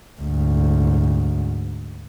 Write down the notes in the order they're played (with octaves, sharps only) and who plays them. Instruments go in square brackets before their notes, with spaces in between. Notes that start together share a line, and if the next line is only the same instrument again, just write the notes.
[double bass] D2 G#2